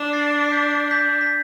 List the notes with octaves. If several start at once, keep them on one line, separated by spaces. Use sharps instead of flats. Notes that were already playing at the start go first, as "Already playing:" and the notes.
Already playing: D4
A6 C7
C7
G6 B6
G6 B6
B6